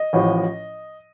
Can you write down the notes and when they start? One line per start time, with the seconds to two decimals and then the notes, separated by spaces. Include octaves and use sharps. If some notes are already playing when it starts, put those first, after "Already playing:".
Already playing: D#5
0.13 A1 A2 F3